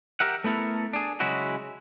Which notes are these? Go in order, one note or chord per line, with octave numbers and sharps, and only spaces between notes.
G4 A#4 E5 F#5
A3 B3 E4 A4 A#4
D4 G#4
C#3 F#3 G#3 C#4 E4 F#4